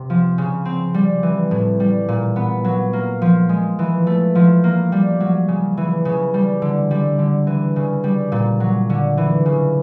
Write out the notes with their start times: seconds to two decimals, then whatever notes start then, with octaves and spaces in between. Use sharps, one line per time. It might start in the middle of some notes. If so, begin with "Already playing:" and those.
Already playing: C3
0.10 F3
0.38 C#3
0.65 C4
0.94 G3
1.23 E3
1.51 A2
1.80 G3
2.09 A#2
2.36 B3
2.64 F#3
2.93 A#3
3.22 F3
3.49 G#3
3.79 E3
4.07 A3
4.35 F3
4.64 A#3
4.92 G3
5.20 F#3
5.48 C#3
5.77 E3
6.05 C#3
6.34 G3
6.62 D3
6.91 G3
7.19 D3
7.47 E3
7.76 C#3
8.04 G3
8.32 A#2
8.60 F#3
8.90 D3
9.17 E3
9.46 C#3